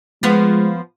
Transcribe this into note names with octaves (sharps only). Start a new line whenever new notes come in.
F3 G#3 B3